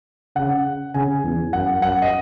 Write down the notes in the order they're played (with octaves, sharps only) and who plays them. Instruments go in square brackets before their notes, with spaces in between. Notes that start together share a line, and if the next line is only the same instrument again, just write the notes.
[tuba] C#3 [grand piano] F#5
[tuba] C#3 [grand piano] G#5
[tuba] E2
[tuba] F#2 [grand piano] F#5
[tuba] F#2 [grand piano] F#5
[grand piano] D#5